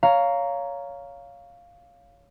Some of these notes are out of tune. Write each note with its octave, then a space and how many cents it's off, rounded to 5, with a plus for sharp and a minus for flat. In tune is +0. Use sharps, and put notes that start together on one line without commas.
C#5 +15 F5 +0 A#5 +0